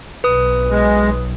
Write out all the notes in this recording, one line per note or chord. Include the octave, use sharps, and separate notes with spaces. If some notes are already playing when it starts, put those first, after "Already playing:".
B1 B4 D#6
G#3